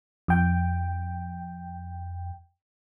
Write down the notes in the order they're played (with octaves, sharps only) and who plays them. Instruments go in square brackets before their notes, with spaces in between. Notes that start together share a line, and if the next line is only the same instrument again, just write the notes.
[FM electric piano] F2 G5